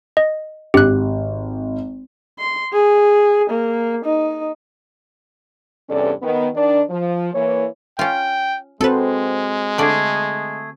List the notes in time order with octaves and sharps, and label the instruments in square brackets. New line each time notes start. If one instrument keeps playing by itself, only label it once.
[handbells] D#5
[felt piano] G#1 [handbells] G4 F#6
[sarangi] C6
G#4
A#3
D#4
[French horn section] E2 G2 C3 C#4 A4 D5
D#3 B3
D#3 D4 D5
F3
E3 A#3 C#5
[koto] C#4 F4 [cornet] G5
[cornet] G#3 [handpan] C4 F#4 C5 [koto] A4 B4
[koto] D3 D5 [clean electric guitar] A3 G#4